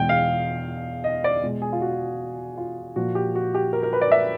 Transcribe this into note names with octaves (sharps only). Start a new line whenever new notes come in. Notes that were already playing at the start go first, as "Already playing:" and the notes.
Already playing: E2 B2 G#3 G5
F5
D#5
D5
B2 G#3
G#4
F4
F#4
F4
A#2 F3 A#3 F#4
G4
F#4
G4
A#4
A#4
B4
D5
E5